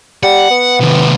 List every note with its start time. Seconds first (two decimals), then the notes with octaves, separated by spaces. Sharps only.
0.23 G3 F#5
0.51 B3
0.81 D#2 C3